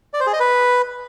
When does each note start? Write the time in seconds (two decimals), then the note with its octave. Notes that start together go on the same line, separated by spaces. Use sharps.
0.14 D5
0.20 C5
0.27 G#4
0.33 D#5
0.40 B4